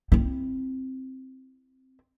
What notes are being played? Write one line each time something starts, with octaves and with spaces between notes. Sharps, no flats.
C4 E4